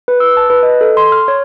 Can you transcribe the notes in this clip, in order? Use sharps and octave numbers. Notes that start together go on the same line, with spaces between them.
B4
E6
A5
B4
D#5
A4
C6
F6
C#5